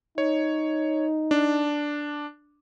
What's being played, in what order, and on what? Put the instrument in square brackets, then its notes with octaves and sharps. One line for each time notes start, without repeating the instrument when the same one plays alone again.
[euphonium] D#4 [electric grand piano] C#5
[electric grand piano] D4